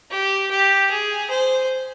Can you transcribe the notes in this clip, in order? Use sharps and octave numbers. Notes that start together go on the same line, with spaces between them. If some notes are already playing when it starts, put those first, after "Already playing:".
G4
G4
G#4
C5